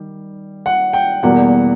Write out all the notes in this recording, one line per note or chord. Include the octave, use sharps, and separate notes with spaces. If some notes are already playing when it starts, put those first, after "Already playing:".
Already playing: D#3 G3
F#5
G5
E2 B2 G3 A#3 F#5